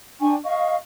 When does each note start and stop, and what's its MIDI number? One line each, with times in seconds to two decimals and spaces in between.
0.20 0.35 62
0.20 0.35 79
0.20 0.35 80
0.20 0.35 85
0.44 0.76 75
0.44 0.76 77
0.44 0.76 85